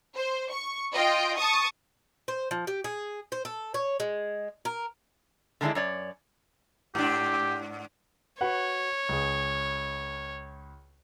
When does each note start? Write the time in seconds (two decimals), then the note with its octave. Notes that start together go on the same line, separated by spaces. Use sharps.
0.17 C5
0.51 C#6
0.94 F4 D#5 G5
1.38 A5 C#6 D#6
2.28 C5
2.51 F3
2.67 G4
2.84 G#4
3.32 C5
3.45 A4
3.74 C#5
4.00 G#3
4.65 A#4
5.61 D3 D#3 G#3 A3 D4 E4
5.75 F#2 C#5 D5
6.95 G#2 D4 G4
8.41 F#4 B4 C#5 F#5
9.09 C#2 G#4